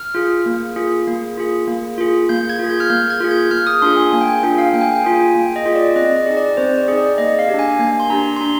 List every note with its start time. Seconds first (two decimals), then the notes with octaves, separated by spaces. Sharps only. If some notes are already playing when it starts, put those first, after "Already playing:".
Already playing: F6
0.15 F4 G#4
0.46 A#3
0.76 F4 G#4
1.07 A#3
1.38 F4 G#4
1.68 A#3
1.98 F4 G#4
2.29 A#3 G6
2.49 G#6
2.59 F4 G#4
2.70 G6
2.80 F6
2.90 A#3 G6
3.10 G#6
3.21 F4 G#4
3.31 G6
3.51 A#3 F6
3.67 D#6
3.82 D4 F4 G#4 C6
3.97 G#5
4.12 A#3 G#5
4.21 G5
4.28 G#5
4.43 D4 F4 G#4 G5
4.58 F5
4.74 A#3 G5
4.81 G#5
4.89 G5
5.04 F4 G#4 G#5
5.34 A#3 G5
5.56 D#5
5.66 F4 G#4
5.76 D5
5.96 C4 D#5
6.17 D5
6.27 D#4 G#4
6.37 D5
6.57 C4 C5
6.78 D5
6.88 D#4 G#4
6.98 D5
7.18 A#3 D#5
7.39 F5
7.49 D4 G4
7.59 G#5
7.79 A#3 G#5
8.00 C6
8.10 D4 G4 A#5
8.37 C6
8.41 D4 A#5